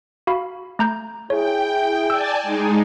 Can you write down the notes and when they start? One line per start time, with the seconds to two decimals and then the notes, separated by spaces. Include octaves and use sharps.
0.27 F#4 F5 B5
0.79 A3 A#5 G6
1.30 E4 G#4 C#5 G5
2.10 D5 G#5 A5 E6
2.43 G#3 D#4